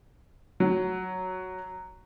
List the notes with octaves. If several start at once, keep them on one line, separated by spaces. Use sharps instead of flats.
F#3